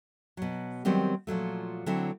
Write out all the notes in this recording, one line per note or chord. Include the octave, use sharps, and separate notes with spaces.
B2 F#3
D#3 F#3 G3 B3 C4
A#2 F3 F#3 A3
D3 F#3 A3 C4 E4